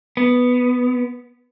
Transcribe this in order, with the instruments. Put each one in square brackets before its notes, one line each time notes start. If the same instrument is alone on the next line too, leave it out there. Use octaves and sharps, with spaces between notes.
[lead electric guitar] B3